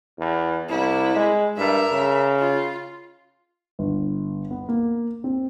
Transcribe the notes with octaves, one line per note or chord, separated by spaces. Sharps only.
E2
C2 E4
G#3
G2 A#4 E5
C#3
F4
G1
B3
A#3
C4